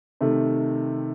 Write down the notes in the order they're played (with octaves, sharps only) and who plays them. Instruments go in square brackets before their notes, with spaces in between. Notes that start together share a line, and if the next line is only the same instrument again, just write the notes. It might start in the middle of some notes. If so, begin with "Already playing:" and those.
[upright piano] C3 D#3 A3